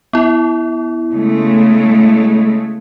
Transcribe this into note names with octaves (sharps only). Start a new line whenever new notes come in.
B3 E4
C#3 G#3 A3